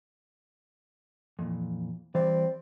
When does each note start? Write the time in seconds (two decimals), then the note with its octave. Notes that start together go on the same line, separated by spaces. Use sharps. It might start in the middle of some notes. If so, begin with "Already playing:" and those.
1.39 F2 A#2 E3
2.15 E3 G3 C4 D5